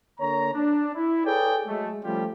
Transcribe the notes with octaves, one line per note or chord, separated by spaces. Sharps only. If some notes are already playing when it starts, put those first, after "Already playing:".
D3 A#3 C#5 A#5
D4
E4
G#4 A4 B4 C#5 D5 G5
F#3 G#3 A3
F3 G3 A3 C#4 F4 G4